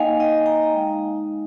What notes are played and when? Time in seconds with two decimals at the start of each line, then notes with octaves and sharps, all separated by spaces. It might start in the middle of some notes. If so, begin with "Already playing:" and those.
Already playing: A#3 D#4 D#5 F5 G5 G#5
0.20 D#5 G5
0.46 G5 A#5
0.72 G#3 D#4